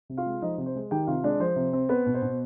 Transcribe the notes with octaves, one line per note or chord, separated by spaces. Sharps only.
C3
F4 F5
G#3
F3 D#4 D#5
C3
C5
G#3
D#3 G4 G5
C3 F4 F5
G#3 D4 D5
F3 C5
C3
C4
B3 B4
B2
C5
B2